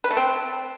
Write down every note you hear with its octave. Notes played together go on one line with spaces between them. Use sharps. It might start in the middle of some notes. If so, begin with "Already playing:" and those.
B4
A3
C4